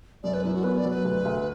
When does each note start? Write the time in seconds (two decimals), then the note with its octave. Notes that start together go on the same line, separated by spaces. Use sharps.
0.23 F#2 D5
0.34 B4
0.44 F#2 E4
0.54 F#4
0.63 B3 B4
0.78 D5
0.84 F#3
0.91 B4
1.04 D2
1.25 D2